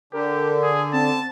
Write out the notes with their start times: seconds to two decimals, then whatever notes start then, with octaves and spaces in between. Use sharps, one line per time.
0.13 D3 G4 A#4
0.62 G#4
0.93 C4 A5